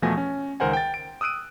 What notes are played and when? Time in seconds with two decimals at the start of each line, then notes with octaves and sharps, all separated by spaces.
0.02 E2 B2 F3 A3 G#5 A#6
0.17 C#4
0.60 C#2 D#3 A#4 C5 F#5 G#5
0.73 G5 A6
0.94 D7
1.21 D#6 E6 F#6 D7 D#7